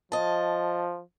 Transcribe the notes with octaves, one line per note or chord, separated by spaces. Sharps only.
F3 D#5 A5